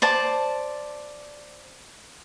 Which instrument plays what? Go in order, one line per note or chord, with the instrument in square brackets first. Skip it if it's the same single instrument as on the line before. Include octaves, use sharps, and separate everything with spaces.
[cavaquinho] C5 D5 A5